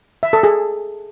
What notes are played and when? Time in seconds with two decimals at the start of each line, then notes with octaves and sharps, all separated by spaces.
0.23 E5
0.33 A4
0.43 G#4